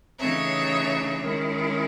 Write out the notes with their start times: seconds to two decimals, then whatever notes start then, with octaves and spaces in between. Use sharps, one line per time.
0.19 C#3 E3 A3 D#4 C#5 E5
1.23 D#3 G#3 C#4 E4